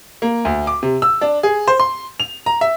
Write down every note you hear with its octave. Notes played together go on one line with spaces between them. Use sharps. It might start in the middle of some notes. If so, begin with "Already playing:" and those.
A#3
D2
D6
C3
E6
D4
G#4
C5
C6
F7
A#5
E5